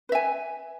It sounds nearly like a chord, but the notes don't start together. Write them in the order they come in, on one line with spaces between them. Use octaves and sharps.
B4 E5 G#5